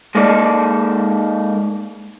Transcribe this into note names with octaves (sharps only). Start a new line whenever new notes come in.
G#3 A#3 D#4 A4 D5